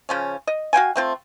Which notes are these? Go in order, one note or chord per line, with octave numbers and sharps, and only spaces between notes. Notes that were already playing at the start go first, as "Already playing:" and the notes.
C#3 F3 C#4
D#5
F#4 F5 G5 G#5
A3 C4 F4